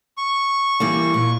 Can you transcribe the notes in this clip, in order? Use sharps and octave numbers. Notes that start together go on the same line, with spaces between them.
C#6
E3 G3 A#3
A#2